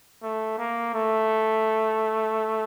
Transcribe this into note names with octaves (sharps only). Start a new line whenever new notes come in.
A3
A#3
A3